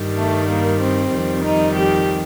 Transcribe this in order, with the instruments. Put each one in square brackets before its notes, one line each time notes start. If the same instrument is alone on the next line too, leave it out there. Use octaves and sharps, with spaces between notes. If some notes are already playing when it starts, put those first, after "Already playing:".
Already playing: [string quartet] G2 D#3 G3
A3
A#3
C4
F2 D#3 G3
D#4
G4